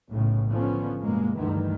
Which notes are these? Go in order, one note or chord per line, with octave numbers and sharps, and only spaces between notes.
B1 A2 C#3
D3 F3 B3 C#4
G2 B2 G#3 A#3
D2 G2 D#3 E3